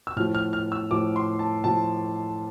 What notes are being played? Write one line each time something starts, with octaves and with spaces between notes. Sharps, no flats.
E6
A2 F3 F6
F6
F6
E6
A2 F3 D6
C6
A5
A2 F3 A5